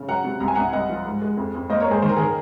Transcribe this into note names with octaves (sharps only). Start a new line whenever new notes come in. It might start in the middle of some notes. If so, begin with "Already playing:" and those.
Already playing: C#3
F#3 F#5 A#5
C3
C2 A#5
G#5
C2 F#5 A#5
C2 D#5 F#5
F3
G#2
G#3
F2
F2
A#3 C5 D#5
A#4 C#5
G#2 G#4 C5
D#3 C5
A#4
D#3 G#4
A#4